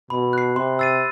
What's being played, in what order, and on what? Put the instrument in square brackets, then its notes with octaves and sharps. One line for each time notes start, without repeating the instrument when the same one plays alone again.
[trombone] B2 [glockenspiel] B5
[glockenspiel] F#6 C7
[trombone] C3 [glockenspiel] C6
[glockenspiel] E6 A6 C7 D#7